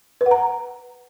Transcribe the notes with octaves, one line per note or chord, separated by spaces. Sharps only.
B4
F#5
A#5